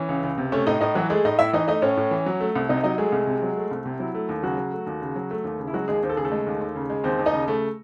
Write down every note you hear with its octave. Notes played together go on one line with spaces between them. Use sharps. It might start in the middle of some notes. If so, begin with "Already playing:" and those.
Already playing: E3 C#4 C#5
C#2
C#2
C3
A3 C#4 C#5
A2 D#4 D#5
A2 D#4 D#5
E3 F#3 F#4
G#3 A3 G#4
A2 D#4 D#5
A2 E4 E5
E3 D#4 D#5
A3 D#4 D#5
A2 C#4 C#5
A2
E3
F#3
A3
C2
C3 D#4 D#5
F#3 D#4 D#5
G#3 A3 G#4
C2
C3
F#3
A3
C2
C3
F#3 E4
A3
D#2
C#3 F#3 F#4
F#3
A3
D#2
C#3
F#3
A3
D#2
C#3
E4
F#3 G#3 F#4
D#2 G#3 G#4
D#2 C5
A4
C#3 G#4
A3 A4
G#3
D#2
D#2
C#3
G#3
D#2 C4 C5
D#2
D#4 D#5
C#3
A3